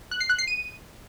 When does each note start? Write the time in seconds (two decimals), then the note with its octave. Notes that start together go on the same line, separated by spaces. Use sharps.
0.11 F#6
0.20 C7
0.29 F#6
0.38 C7
0.47 D#7